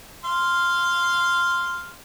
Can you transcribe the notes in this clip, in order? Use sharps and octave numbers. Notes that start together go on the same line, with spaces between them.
F5 C6